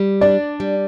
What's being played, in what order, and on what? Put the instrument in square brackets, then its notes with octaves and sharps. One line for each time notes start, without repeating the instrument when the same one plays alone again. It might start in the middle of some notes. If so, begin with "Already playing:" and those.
Already playing: [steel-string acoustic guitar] G3
[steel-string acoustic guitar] D4 [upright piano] D5
[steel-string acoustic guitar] G3